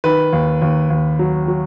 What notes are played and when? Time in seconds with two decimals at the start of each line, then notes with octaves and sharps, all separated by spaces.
0.04 D#3 B4
0.33 D#2
0.62 D#2
0.90 D#2
1.19 F#3
1.48 F#3